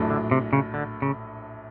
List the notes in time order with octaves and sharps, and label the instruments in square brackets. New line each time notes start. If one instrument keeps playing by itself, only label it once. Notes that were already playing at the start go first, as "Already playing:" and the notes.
Already playing: [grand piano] A#1 A2 F#3 A3 D4
[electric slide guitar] D3
C3
C#3
D3
C#3